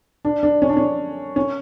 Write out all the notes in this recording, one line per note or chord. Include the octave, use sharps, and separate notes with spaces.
D4
D4
C#4
D4
C#4
C#4